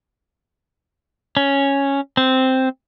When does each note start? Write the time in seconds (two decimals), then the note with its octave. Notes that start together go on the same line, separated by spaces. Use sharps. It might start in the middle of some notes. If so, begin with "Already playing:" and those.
1.37 C#4
2.17 C4